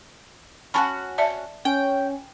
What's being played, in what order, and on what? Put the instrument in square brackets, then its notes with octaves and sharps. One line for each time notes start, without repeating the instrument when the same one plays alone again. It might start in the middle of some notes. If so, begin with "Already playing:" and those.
[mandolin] C#4 F4 F#4 [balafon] G#5 A5 B5
[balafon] D5 E5 A5
[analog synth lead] C#4 [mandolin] G5